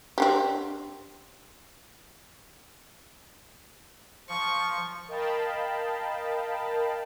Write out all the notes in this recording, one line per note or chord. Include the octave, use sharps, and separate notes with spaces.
C4 D4 G4
F3 C#6
A#4 D#5 F5 G5 A5 B5